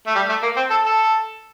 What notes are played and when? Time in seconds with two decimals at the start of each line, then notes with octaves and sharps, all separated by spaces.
0.07 A3
0.15 G3
0.29 A3
0.43 A#3
0.57 C4
0.70 A4
0.84 A4